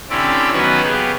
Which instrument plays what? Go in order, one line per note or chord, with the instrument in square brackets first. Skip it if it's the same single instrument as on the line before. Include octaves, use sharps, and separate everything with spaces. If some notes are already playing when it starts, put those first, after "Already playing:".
[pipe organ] D3 C4 C#4 E4 G4 D5
D#3 F#3 B3 C#4 F#4 B4
C#3 B3 G4 G#4